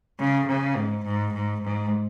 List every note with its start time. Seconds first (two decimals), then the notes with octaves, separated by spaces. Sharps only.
0.19 C#3
0.47 C#3
0.76 G#2
1.04 G#2
1.33 G#2
1.61 G#2